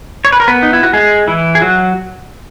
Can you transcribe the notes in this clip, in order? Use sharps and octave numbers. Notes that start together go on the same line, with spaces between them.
C#5
B4
A#4
B3 B4
D#4
E4
F#4
G#3 G#4
E3 E4
G#4
F#3 F#4